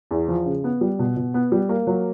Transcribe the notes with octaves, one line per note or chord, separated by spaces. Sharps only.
E2
F3
C#3
B3
G3
B2
B2
B3
G3
A#3
F#3